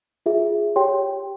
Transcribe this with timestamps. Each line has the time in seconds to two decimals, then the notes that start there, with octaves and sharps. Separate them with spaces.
0.26 F4 G#4 E5
0.76 G4 C#5 G5 C6